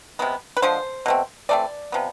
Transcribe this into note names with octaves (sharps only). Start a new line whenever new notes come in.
C3 G#3 B3
B4
D3 F3 G#3 C5
B2 A3 C4
E3 A3 C4 D5
C3 F3 B3